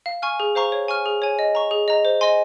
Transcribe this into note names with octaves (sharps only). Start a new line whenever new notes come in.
F5
G#5 C#6 F6
G#4
C5 F5 A#5 C#6
C#5
G#5 C#6 F6
G#4
C#5 G#5
D#5
A#5 C#6
G#4
D#5 A#5
C5
D#5 G#5 C6